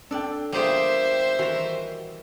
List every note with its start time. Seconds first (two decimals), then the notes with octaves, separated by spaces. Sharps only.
0.11 D4 A4 D5 G5
0.52 E2 G3 A#3 F4 G4 G#4 C5 E5
1.39 D#3 E3 F#4 A#5